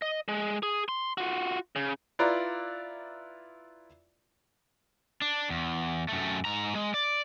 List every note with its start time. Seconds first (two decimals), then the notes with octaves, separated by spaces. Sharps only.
0.02 D#5
0.28 G#3
0.63 G#4
0.89 C6
1.18 F4 F#4
1.76 C#3
2.19 E4 F4 B4 D5 A#5
5.22 D4
5.50 E2
6.08 F#2 A3
6.45 G#2 A#5
6.75 G#3
6.94 D5